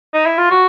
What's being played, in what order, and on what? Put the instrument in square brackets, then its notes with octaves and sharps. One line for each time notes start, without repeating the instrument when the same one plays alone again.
[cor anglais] D#4
E4
F4
F#4